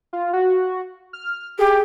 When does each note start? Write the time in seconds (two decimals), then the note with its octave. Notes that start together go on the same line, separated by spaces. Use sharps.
0.13 F4
0.33 F#4
1.13 F6
1.59 G4 G#4